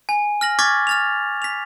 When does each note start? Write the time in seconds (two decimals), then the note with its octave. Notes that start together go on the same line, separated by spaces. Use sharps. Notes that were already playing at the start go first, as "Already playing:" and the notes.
0.09 G#5
0.41 F6 A#6 F#7
0.59 C#6 D6 F6 G#6 A6 B6
0.87 F6 A6 F7
1.42 B6 F7